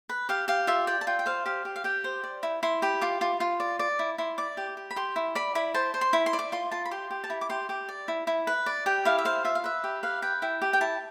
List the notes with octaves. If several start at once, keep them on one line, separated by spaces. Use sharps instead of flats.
B4
G4 F5
G4 F5
F4 E5
D5 G5
A5
F4 G5
G5
C5 F5
G4 F5
G4
F5
G4 G5
C5
D5
E4
E4 C6
G4 B5
F4 D6
F4
F4
D5
D5
E4
E4 C6
D5 D6
G4
G4
B5
G4 C6
E4
D5 B5
E4 B5
C5 A5
C5
C6
E4 B5
C6
D5
D6
F4 C6
F4 A5
B5
G4 C6
G4
A5
E4 B5
D6
G4 C6
G4 D6
D5
E4
E4
B4
D5
G4 G5
E4 F5
E5
C5 F5
F4 E5
F5
B4 E5
G4
B4 F5
B4 G5
E4 G5
G4
G5
E4 A5